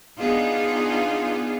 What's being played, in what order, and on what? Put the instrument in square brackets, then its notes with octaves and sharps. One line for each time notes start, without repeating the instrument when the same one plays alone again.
[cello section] B3 D4 D#4 F4 G#4